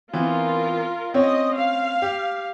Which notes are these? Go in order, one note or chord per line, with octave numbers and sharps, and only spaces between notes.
E3 B3 C4 F4 A#4
C4 C#4 C#5 D#5
F5
G4